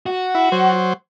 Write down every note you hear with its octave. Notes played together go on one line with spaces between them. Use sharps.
F#4
E4
F#3 C5